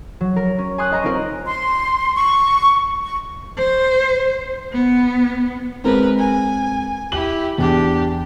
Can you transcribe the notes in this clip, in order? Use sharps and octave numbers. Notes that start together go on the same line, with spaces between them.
F#3
A#4
C#4
G#5 C6 D#6 F#6
D#5 G#5 A#5 C6 C#6
C4 D#4 F4 A#4
C6
C#6
C#6
C5
B3
G#3 C4 A#4 B4
G#5
E4 G4 F#7
E2 D4 G4